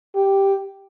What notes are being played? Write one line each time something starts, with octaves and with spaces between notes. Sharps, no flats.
G4